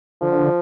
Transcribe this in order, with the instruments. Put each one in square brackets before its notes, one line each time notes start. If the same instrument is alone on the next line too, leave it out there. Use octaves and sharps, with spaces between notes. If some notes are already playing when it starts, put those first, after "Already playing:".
[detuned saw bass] D3 [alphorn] F3